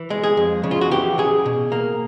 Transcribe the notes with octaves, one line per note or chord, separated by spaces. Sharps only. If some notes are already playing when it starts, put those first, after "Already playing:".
Already playing: E3
G#3
G#4
F2
C#3
F4
F#4
E3 G4
C#3 G#4
B2
A#3